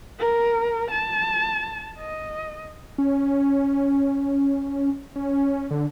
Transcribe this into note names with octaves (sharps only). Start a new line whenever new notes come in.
A#4
A5
D#5
C#4
C#4
D3